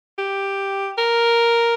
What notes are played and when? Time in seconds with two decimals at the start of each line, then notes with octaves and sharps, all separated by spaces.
0.18 G4
0.98 A#4